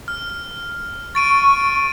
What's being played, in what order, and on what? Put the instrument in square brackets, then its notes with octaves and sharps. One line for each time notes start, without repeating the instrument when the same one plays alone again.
[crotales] F6
[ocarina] C#6 [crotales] A6 D7 D#7